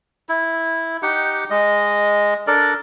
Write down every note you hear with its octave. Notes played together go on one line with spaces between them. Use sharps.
E4
D#4 G4 F#5
G#3 D#5
D4 A4 A#4 D5